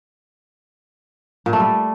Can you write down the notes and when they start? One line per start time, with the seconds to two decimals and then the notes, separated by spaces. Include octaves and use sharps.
1.46 A#2
1.53 A3
1.60 G3